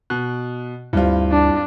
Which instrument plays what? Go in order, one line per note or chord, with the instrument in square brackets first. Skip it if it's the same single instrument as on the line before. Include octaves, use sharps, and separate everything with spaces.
[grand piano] B2 [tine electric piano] F#6
[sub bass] D2 [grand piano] G2 C4 F4 [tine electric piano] G3 E4
[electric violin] D4